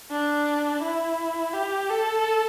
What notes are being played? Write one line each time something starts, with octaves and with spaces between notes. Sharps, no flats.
D4
E4
G4
A4